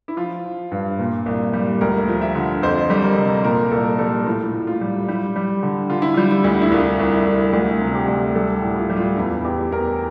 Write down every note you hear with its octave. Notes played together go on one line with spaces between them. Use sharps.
E4
F3 F4
F3
G2
A#2
C2
G3
D2 A#4
F3
E5
D3
F2 C5
G3
A#4
C3
A#2 A#4
C2 A4
G3 A4
A2 F4
A2
F4
G3
G3 E4
G3
D3
D3 F4
E4
G3 F4
E4
D2
E4
C2 F4
C2
E4
C2
D2 F4
C3
G4
D2
G3 A4
G4
A2
F4
G3
F4
E2 E4
E2 G4
E2 A#4